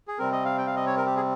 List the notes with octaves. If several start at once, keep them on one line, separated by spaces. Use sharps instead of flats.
G#4
C3 G3 C4 A#4
D#5
F5
G5
F5
D#5
C#5
A#4
G4
G#4